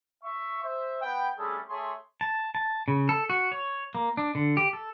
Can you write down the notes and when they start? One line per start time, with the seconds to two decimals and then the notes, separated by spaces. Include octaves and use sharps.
0.23 E5 C#6
0.62 C5 E5
1.02 B3 G5
1.38 G3 A3 C4 C#4 G#4 A4
1.69 A3 G#4 C#5 E5 C6
2.21 A5
2.55 A5
2.88 C#3
3.09 A4
3.30 F#4
3.52 C#5
3.95 A#3
4.17 D4
4.35 D3
4.57 G4
4.73 A4